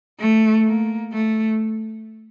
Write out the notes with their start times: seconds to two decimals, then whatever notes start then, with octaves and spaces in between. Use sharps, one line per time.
0.19 A3
0.66 A#3
1.12 A3